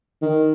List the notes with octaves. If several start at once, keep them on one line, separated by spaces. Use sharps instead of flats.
D#3